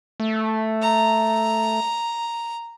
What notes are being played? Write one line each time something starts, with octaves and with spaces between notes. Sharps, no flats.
A3
A#5